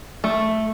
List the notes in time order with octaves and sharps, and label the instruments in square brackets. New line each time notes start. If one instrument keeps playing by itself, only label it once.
[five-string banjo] A3